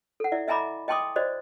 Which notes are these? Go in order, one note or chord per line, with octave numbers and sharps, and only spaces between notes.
A4 F#5
E4 D5 E5
D#5 E5 G#5 A#5 B5 D6
D#5 G5 A5 C6 D6 D#6
F#4 C5 D5 D#5